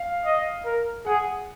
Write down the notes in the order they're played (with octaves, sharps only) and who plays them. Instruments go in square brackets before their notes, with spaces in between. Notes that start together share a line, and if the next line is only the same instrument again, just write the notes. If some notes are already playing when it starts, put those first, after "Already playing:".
Already playing: [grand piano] F5
[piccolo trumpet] D#5
A#4
[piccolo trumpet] G#4 [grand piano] F#5